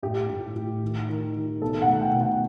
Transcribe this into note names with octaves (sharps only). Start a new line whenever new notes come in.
A2 G4
A2
A2
D#3
D#3
D#3
B2 A4
F#5
A3
G5
B2
F#5